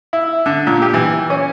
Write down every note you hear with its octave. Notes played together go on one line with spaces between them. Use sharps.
E4
D3
A#2
G4
E3
C#4